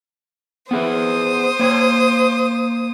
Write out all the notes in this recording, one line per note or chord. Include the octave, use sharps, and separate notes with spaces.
B3 G#4 B4 C5 D#6
A#3 C#5